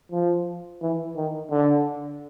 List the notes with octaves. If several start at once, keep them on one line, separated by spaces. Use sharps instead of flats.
F3
E3
D#3
D3